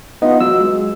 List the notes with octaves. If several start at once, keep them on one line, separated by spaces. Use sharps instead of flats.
B3 D#4 F4
F#3 E6
G#3